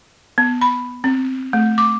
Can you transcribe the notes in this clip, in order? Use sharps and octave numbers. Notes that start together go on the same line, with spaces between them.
B3
B5
C4
A3
D6